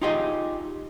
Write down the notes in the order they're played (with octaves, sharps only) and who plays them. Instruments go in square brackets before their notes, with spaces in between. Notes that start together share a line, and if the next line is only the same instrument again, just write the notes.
[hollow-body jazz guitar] D#4 F4 G4 G#4 D#5